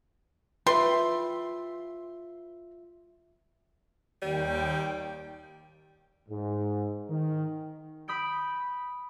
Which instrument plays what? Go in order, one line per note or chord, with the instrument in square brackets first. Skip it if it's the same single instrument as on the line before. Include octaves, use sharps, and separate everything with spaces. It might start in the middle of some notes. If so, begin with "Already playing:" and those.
[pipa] G3 C6 [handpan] F4 E5 [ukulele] B4
[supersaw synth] D#2 G5 [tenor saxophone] G3
[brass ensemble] G#2
D#3
[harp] B5 D#6 G6 D7